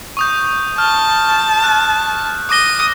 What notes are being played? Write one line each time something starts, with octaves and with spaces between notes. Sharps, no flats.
C#6 D#6 G6
A5 F6
F#6
D6 D#6 A#6 G7